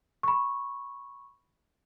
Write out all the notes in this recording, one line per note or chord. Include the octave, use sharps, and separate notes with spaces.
B5 C#6